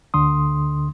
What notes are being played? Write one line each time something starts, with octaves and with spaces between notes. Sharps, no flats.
D2 D3 C6 D#6